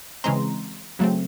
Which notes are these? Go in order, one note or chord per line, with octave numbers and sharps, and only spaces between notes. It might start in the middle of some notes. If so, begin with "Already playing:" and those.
C#3 E3 G#3 C4 A#5 C6
C#3 F#3 A3 C4